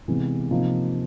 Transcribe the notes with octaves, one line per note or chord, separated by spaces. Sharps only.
C3 E3 G#3 B3
C3 F3 A#3 D#4